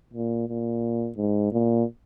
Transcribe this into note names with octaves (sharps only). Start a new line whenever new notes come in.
A#2
A#2
G#2
A#2